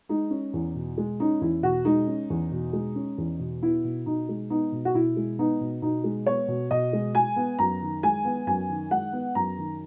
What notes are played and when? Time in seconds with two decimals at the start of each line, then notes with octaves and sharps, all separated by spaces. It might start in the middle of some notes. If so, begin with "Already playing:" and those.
0.09 G#3 D#4
0.31 C#4
0.54 E2
0.75 B2
0.98 G#3
1.20 C#4 D#4
1.41 E2 E4
1.63 B2 F#4
1.85 G#3 D#4
2.07 C#4
2.30 E2
2.52 B2
2.73 G#3
2.96 C#4
3.18 E2
3.39 B2
3.62 B3 E4
3.84 B2
4.06 B2 D#4
4.29 G#3
4.50 B3 D#4
4.72 B2
4.85 F#4
4.94 B2 E4
5.17 G#3
5.39 B3 D#4
5.61 B2
5.82 B2 D#4
6.04 G#3
6.27 B3 C#5
6.48 B2
6.71 B2 D#5
6.93 G#3
7.15 G#3 G#5
7.36 B3
7.59 F#2 A#5
7.82 D#3
8.03 G#3 G#5
8.25 B3
8.47 F#2 G#5
8.69 D#3
8.91 G#3 F#5
9.13 B3
9.35 F#2 A#5
9.58 D#3